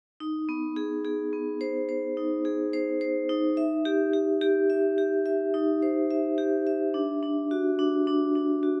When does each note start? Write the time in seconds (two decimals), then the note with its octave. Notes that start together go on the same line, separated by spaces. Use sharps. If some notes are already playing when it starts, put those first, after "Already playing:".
0.20 D#4
0.49 B3
0.76 G#4
1.05 G#4
1.33 B3
1.61 C5
1.89 C5
2.17 D#4
2.45 G#4
2.73 C5
3.01 C5
3.29 D#4
3.57 E5
3.85 G4
4.13 G4
4.41 G4
4.70 E5
4.98 G4
5.26 E5
5.54 D#4
5.82 C5
6.11 E5
6.38 G4
6.67 E5
6.94 D4
7.23 D4
7.51 F#4
7.79 D4
8.07 D4
8.36 D4
8.63 F#4